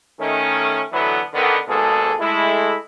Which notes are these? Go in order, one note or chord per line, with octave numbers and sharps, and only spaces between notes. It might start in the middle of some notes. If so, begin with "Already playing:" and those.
D#3 A3 C#4
D3 E3 F#3 A3 B3
D3 D#3 B3
G#1 G#2 B2 A#3 G#4 A4
G#3 A3 E4